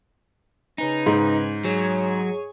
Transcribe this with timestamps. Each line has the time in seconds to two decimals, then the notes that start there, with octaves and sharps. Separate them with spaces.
0.78 C#3 D#4 B4 G#5
1.06 G#2
1.64 F#3 G#4 C#5 G#5